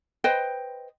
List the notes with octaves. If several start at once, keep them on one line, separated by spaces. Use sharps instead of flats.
B4 C5 D#5 G5